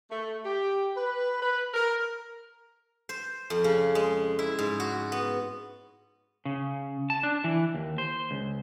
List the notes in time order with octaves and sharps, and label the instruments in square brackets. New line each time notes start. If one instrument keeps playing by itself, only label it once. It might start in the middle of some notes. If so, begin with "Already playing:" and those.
[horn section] A3
G4
B4
B4
A#4
[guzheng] C5
F2
C#3
G#3
E4
G#2
F#4
B3
[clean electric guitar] C#3
A5
D4
E3
D#2
C5
C#2